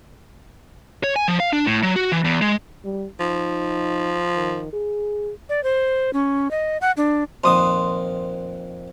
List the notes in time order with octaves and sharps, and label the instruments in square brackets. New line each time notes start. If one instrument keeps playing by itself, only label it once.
[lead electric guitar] C#5
G#5
F3
F5
D4
A2
F#3
F#4
E3
E2
G#3
[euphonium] G3
[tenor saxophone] F3 [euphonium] D#4
[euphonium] D#3
G#4
[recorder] D5
C5
C#4
D#5
F#5
D4
[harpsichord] F2 A#2 D#3 [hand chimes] C5 [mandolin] C6 D#6